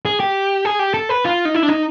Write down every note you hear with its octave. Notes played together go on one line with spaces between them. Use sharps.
G#4
G4
G#4
G4
A4
B4
F4
D#4
E4
D4
D#4